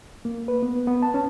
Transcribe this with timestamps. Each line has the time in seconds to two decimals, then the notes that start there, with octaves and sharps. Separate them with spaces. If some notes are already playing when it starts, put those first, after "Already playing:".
0.25 A#3
0.48 B4
0.62 B3
0.87 B3
1.02 A5
1.14 C#4